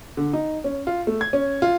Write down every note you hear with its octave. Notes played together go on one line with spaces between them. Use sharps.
D3
D#4
C#4
F4
A3
G#6
C#4
F4